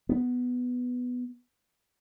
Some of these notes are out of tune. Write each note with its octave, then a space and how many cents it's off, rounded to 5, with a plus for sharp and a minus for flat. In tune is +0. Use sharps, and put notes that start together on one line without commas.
B3 +5